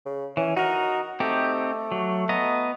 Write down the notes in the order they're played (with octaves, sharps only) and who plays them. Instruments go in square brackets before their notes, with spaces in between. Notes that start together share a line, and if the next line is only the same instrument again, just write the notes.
[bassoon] C#3
[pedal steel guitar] E3 [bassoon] C#4
[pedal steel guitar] D#4 A#4 [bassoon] F#4
[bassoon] A3 [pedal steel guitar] C4 D#4 G4
[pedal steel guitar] F#3
B3 D#5 A#5